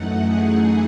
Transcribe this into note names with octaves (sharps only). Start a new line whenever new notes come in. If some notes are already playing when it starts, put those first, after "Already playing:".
Already playing: F#2 E3 A3 D#4 F#5
G#4